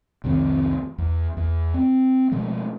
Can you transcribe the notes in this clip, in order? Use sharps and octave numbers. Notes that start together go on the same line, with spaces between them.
C2 F2 D#3 C4
E2
E2
C4
B2 F3 G#3 A3